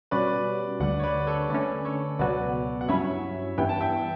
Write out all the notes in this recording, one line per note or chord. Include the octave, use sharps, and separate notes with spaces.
B2 G3 C#4 F#4 B4 D5
D2 D3 G3 D5 F#5
C#5
B4 D5
A4 C#5
D3 A3 C#4 B4 D5
A4 C#5
C#2 B2 F#3 B3 F#4 B4 D5
F#5
G2 F#3 C#4 E4 C#5 E5
G2 E3 B3 E4 G5
A5
E5 G5